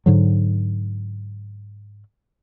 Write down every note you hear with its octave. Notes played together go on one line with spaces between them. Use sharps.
G#2 D3 F#3